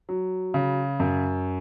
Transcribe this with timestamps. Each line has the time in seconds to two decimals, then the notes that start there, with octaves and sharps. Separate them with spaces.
0.09 F#3
0.54 C#3
1.00 F#2